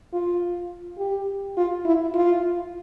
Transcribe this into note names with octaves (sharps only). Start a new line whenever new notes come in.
F4
G4
F4
E4
F4